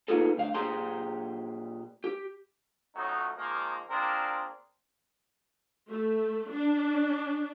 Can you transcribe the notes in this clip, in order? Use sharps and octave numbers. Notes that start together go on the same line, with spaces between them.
A#3 B3 D#4 F4 G#4 A4
D2 F5
A#2 G4 G#4 A#5 C6
G4
F2 F#3 A3 C#4 D#4
D#3 F3 G#3 A#3
A#3 C4 D4 F4 G#4 A#4
A3
D4